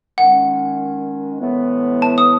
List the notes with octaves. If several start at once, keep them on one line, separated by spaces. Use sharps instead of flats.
D#3 G#3 C#4 F#5
A2 E3 G#3 B3
A5
D#6